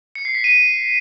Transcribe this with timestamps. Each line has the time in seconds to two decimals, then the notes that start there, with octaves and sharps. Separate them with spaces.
0.15 C#7
0.25 C7
0.35 B6
0.44 D#7